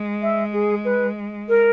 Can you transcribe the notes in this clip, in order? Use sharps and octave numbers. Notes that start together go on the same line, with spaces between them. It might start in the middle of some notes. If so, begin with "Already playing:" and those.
Already playing: G#3
E5
G#4
B4
A#4